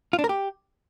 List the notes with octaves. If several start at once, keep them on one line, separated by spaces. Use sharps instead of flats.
F4
D4
A#4
G4